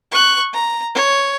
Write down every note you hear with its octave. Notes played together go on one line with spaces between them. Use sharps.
C#6 F#6
A#5
C#5